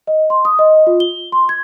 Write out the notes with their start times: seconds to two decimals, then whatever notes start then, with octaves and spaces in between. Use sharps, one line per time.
0.07 D#5
0.30 C6
0.45 D#6
0.59 D#5
0.87 F4
1.00 G7
1.32 C6
1.49 G#6